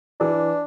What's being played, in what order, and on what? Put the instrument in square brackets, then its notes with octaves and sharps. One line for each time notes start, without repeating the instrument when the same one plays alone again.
[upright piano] E3 [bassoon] D4